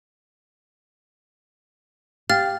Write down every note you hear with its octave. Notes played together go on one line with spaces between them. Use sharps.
G4 F5 F6 A6